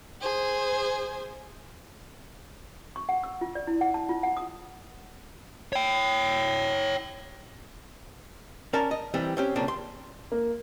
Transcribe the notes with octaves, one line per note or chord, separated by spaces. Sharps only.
G#4 C5
C#6
F#5
E6
F4
D5
E4
F#5
A5
F4
F#5
D#6
C#5 G5
C#4 A#4 D5 A5
D#5
E3 G3 C4
C4 C#4 G4
B1 A#2 C#3 C4 D4
C6
A#3